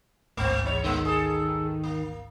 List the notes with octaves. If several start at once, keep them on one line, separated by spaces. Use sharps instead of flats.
A1 D2 G#2 A3 C4
E2 G3 C#5
D#3 G#3 B3
G#4 A4
A#3